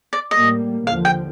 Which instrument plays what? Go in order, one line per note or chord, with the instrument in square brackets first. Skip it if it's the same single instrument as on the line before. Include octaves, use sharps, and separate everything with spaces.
[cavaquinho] D5
[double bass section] A2 G3 A#3 [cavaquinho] D#5
[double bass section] D#2 D3 F3 [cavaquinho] F5
[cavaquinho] G5